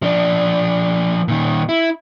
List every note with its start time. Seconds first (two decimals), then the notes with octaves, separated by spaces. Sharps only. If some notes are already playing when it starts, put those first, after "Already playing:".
0.02 F3 D4
1.28 A#2 D#3
1.69 E4